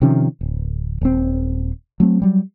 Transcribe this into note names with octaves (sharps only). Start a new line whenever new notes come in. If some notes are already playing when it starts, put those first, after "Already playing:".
C3 D#3 F3 C#4
D1
D#1 C4
F#3 A3 C4
F#3 G3